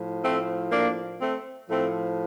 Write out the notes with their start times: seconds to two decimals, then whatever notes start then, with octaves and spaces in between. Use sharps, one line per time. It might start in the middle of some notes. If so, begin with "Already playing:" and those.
Already playing: A2 F3
0.22 A3 C4
0.71 A#3 D4
1.20 A3 C4
1.69 A2 F3 A3 C4